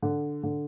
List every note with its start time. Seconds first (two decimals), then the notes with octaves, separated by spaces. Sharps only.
0.02 D3
0.43 D3